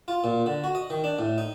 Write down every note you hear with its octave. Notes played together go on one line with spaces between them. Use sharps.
F4
A#2
D3
F#4
D#5
D#3
D4
A2
D#4